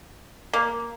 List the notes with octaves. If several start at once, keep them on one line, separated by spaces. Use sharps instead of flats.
A#3